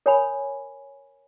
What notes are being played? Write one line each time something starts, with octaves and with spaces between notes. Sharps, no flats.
A#4 C#5 G#5 B5